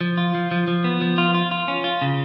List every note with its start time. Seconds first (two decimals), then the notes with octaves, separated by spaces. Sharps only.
0.01 F3
0.17 F4
0.35 F3
0.51 F3
0.68 F3
0.84 B3
1.02 F3
1.18 F4
1.35 F4
1.51 F4
1.68 C#4
1.84 F4
2.02 C#3